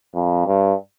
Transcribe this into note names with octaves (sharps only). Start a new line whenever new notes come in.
F2
G2